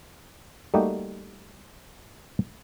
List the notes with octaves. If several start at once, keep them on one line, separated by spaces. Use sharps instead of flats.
G3 A3 A#3 D#4 F#4 G4